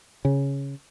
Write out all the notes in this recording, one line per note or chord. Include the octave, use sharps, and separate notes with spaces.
C#3